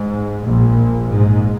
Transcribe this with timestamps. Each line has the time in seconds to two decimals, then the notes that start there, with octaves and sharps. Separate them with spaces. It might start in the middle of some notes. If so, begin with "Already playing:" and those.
Already playing: G#2
0.44 A#1 A#2
1.10 G#2